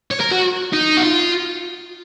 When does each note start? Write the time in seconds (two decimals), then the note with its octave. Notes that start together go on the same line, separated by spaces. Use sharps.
0.11 C#5
0.21 A#4
0.32 F#4
0.73 D#4
0.97 F#4
1.04 F4